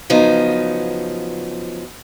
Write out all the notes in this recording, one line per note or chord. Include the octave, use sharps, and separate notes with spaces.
C#3 F3 F#3 B3 D#4